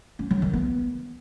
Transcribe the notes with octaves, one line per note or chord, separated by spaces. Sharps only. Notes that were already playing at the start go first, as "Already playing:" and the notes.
C#4
F#3
D#3
B3